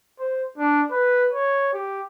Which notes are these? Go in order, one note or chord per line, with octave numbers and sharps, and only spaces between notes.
C5
D4
B4
C#5
G4